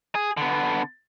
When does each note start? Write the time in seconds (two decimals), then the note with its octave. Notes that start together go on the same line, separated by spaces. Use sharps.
0.15 G#4
0.37 D3 B3